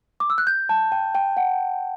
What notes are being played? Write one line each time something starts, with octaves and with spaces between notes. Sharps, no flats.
D6
E6
F#6
G6
A5
G5
G5
F#5